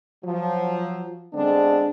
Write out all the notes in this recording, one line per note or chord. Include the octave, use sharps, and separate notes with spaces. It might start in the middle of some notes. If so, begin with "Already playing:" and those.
F3 F#3
D3 G#3 B3 C4 D4